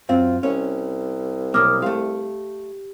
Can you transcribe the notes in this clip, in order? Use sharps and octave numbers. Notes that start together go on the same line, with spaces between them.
F#2 C4 F4
C2 C#4
B1 A#3 D6 D#6 F6
A3 G4 F5